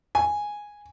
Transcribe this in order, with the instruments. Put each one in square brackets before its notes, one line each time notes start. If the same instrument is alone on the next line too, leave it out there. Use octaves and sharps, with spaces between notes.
[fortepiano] G#5